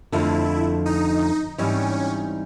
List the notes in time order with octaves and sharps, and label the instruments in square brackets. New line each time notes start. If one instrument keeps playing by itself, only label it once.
[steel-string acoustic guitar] F2 D3 F3 A3 [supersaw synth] E4
[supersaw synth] D#4
[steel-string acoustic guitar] G#2 E3 G3 C4 D#4 [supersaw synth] C#4